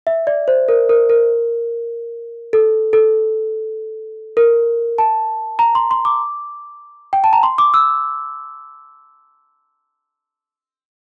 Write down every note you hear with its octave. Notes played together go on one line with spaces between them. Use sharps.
E5
D5
C5
A#4
A#4
A#4
A4
A4
A#4
A5
A#5
C6
C6
D6
G5
A5
A#5
C6
D6
E6